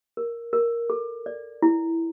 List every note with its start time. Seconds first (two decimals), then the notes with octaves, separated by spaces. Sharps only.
0.17 A#4
0.53 A#4
0.90 A4
1.26 D5
1.62 E4